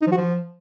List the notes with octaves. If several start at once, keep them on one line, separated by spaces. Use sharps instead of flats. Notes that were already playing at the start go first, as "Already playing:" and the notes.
D#4
F3
F#4
F3